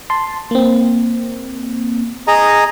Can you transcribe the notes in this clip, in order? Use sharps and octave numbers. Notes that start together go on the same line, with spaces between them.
A5 C6
A#3 C4
G#4 D#5 A#5